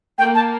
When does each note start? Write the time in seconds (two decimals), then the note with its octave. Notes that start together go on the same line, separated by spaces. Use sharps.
0.18 A#3 G5
0.35 A5